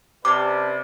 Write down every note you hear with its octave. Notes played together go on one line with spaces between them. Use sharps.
C3 C#4 B4 D5 A5 C6 D6